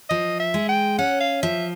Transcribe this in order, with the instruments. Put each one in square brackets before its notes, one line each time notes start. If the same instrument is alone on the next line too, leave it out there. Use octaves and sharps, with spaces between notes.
[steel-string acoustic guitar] F3 [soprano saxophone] D#5
[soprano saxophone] E5
[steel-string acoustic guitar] G#3
[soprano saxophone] G5
[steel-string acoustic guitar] C#4 [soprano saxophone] F#5
[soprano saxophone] F5
[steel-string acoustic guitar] F3 [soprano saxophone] E5